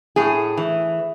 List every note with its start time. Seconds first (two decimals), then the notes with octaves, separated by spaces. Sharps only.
0.16 A2 G#4
0.57 E3